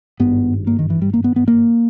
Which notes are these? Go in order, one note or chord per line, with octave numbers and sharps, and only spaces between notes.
G#1 G2 B3
A#3
D#3
E3
G3
A#3
B3
B3
A#3